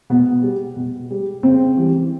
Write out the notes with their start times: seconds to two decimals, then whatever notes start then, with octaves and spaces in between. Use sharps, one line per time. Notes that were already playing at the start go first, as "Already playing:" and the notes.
0.10 B2 B3
0.43 G3
0.76 B2
1.11 G3
1.43 C#3 C4
1.77 E3 G3